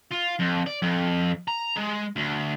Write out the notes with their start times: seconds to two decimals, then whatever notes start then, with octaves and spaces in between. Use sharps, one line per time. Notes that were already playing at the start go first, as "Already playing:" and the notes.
0.12 F4
0.40 F2
0.67 D5
0.82 F2
1.48 A#5
1.76 G#3
2.16 D2